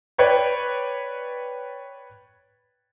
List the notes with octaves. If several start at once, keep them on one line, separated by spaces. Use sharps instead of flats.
B4 C#5 D5 G5 B5